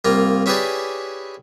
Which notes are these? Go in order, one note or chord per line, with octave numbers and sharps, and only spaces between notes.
C2 A#3 F4
C#4 E4 G4 G#4 B4 D5